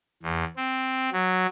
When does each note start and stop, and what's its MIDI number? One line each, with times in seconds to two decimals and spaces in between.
0.23 0.44 40
0.57 1.10 60
1.12 1.47 54